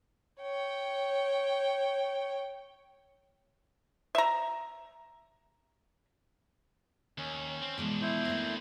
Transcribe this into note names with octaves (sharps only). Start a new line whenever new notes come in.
C#5 G5
E5 A#5
D#2 C#4
C4
B2 E3 F3 G#3 D4
E4 C5
A3 B3 C4 D4 A#4